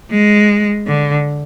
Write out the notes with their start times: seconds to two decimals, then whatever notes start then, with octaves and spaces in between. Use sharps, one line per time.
0.11 G#3
0.87 D3